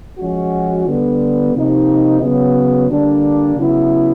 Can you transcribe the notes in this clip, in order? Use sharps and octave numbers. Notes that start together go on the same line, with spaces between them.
F3 G#3 C#4 F#4
D3 G3 B3
C3 F3 A#3 D#4 G4
C#3 F#3 B3
D3 G3 A#3 D4
C#3 F#3 B3 E4